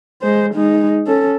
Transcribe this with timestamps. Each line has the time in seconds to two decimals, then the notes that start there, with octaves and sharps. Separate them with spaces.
0.22 G#3 C5
0.54 G#3 D#4
1.07 C#4 A4